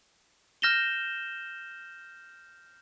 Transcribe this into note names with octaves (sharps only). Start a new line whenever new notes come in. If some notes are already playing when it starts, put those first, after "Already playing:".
F6 G6 A#6 E7 F7 G7